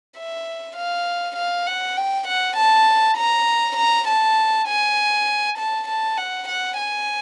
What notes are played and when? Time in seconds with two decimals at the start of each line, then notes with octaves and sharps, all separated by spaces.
0.17 E5
0.77 F5
1.36 F5
1.67 F#5
1.97 G5
2.27 F#5
2.56 A5
3.16 A#5
3.77 A#5
4.07 A5
4.68 G#5
5.57 A5
5.88 A5
6.17 F#5
6.48 F#5
6.77 G#5